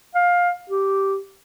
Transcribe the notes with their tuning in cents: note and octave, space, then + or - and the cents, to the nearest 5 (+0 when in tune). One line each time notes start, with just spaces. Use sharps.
F5 +20
G4 -10